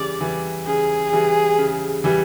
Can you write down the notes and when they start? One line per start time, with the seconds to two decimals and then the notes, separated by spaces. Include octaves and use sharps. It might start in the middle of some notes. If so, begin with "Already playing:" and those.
Already playing: C#3 E3 G3 D5
0.21 E3 G3
0.66 C#3 G#4
1.13 E3 G3
1.58 C#3
2.04 E3 G3